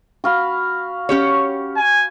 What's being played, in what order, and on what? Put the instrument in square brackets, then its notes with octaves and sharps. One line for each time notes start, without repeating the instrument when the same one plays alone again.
[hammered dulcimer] F#4 F5 B5
[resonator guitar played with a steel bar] C#4 G4 C#5
[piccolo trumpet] G#5